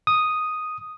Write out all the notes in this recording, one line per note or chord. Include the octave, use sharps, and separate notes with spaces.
D#6